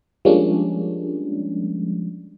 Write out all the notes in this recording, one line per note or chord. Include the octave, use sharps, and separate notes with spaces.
F3 G3 G#3 A#3 C#4 D4